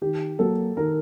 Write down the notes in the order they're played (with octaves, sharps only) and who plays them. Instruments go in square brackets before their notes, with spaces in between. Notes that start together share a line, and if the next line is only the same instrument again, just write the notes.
[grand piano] D#3 [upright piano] G4
[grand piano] F#3 A#3 [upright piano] A4
[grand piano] D#3 [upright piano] A#4